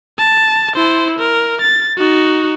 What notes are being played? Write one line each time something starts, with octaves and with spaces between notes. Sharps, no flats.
A5
E4 C5
A#4
A6
D#4 F#4